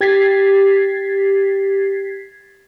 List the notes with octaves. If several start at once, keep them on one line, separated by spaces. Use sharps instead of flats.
G4 G#6 A6 B6 C7